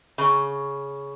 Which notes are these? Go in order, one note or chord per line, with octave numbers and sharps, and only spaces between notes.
C#3